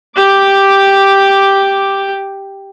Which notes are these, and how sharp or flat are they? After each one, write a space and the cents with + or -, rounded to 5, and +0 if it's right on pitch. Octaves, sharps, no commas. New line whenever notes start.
G4 +0 D6 +0